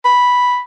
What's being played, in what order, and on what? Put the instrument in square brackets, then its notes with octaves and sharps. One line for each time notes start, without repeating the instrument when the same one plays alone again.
[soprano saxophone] B5